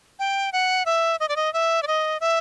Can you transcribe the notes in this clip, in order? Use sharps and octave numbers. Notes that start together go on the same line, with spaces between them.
G5
F#5
E5
D#5
D5
D#5
E5
D5
D#5
E5